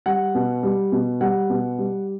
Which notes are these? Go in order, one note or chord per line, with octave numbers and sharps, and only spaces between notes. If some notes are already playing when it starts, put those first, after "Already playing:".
G3 F#5
B2
G3
B2
G3 F#5
B2
G3